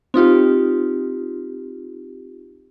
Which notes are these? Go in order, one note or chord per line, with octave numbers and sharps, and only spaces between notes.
C4 D#4 F4 G4